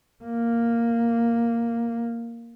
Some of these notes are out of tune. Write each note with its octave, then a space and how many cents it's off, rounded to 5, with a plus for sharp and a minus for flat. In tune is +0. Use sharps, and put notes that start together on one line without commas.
A#3 -5